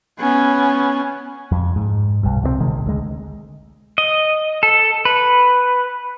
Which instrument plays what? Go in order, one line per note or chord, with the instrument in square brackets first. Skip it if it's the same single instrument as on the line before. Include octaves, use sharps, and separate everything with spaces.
[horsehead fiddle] B3 C#4
[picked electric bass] F2
G#2
B1 G2
C2 C3 G#3 C4
A#1 C3 D#3 G#3
D2 G#3
[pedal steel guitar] D#5
A4
B4